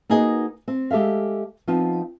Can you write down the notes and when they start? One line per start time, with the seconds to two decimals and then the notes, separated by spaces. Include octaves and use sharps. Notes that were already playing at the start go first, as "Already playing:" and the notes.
0.10 A#3 D#4 F#4 G#4 B4 D#5
0.68 C4
0.91 G#3 G4 A4 E5 F5
1.68 F3 B3 C4 D#4 F4